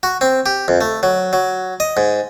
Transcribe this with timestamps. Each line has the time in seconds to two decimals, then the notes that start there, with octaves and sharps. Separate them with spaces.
0.03 F#4
0.21 C4
0.46 G4
0.68 F2
0.81 A3
1.03 F#3
1.33 F#3
1.80 D#5
1.97 G#2